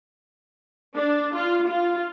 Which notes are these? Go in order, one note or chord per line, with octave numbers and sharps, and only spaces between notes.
D4
F4
F4